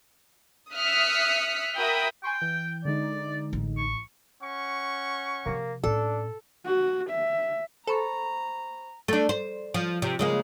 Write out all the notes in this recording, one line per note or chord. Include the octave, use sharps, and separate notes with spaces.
E5 D#6 F6 F#6 B6 C#7
F#4 A#4 E5 G5 B5 D#6
G5 G#5 C6 C#6
E3 G6
D3 G#3 D#4 D5
A1
C#6
C#4 F#5 C#6
C3 F3 A#3
A2 C#4 D4 A4
F#4
E5
A4 C5 A#5 B5 C#6
A3 D4
C5
F3
C3
C#3 G#3 A#3